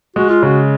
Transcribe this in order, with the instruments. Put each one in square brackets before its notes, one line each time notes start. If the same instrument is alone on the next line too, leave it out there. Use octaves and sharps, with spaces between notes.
[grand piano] G#3 [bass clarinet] F#4
[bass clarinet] F4
[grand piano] C#3 [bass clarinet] F#4